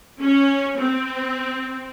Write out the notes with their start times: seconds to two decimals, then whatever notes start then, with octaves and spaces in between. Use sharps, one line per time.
0.19 C#4
0.77 C4